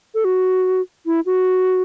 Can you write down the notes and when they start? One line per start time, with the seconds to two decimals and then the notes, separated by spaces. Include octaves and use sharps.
0.14 A4
0.24 F#4
1.06 E4
1.26 F#4